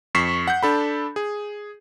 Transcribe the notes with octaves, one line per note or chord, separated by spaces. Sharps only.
F2 C#6 B6 C7 E7
F#5 G6
D4 A4 B5
G#4